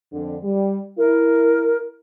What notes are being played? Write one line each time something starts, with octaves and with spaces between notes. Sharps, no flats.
F2 D3
G3
E4 A#4